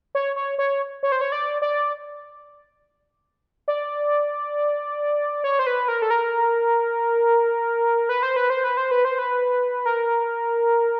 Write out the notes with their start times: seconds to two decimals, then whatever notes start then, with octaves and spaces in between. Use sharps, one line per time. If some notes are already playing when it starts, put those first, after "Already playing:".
0.15 C#5
0.36 C#5
0.59 C#5
1.03 C#5
1.12 C5
1.21 C#5
1.32 D5
1.62 D5
3.68 D5
5.44 C#5
5.59 C5
5.67 B4
5.88 A#4
6.02 A4
6.10 A#4
8.09 B4
8.23 C5
8.36 B4
8.50 C5
8.64 B4
8.77 C5
8.91 B4
9.05 C5
9.19 B4
9.86 A#4